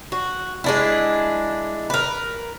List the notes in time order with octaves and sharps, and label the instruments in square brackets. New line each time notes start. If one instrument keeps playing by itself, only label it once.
[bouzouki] F#4
G#3 D4 E4
A#4 B4